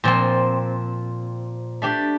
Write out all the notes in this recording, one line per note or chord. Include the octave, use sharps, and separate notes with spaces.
A#2 F3 C4
A3 D4 G4 D5